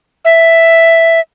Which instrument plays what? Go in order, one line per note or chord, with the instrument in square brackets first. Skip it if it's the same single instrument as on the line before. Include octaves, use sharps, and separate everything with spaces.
[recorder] E5